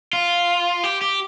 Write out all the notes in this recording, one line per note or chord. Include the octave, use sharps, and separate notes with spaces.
F4
G4
G4